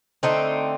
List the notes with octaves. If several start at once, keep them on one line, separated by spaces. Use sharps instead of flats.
D3 A3 C4 D#4